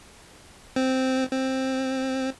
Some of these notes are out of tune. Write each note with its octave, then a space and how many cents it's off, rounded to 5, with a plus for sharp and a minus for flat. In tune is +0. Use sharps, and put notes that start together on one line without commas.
C4 -5
C4 +10